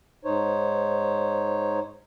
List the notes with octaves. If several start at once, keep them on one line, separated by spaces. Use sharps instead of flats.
G#2 D#4 C5 C#5